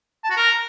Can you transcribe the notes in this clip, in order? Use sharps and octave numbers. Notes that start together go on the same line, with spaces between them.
A5
F#4
A#4